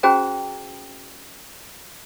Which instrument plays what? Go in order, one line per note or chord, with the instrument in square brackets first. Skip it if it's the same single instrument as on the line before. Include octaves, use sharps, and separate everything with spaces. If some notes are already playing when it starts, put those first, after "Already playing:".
[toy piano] C#4 F#4 G#4 C5 G5 A#5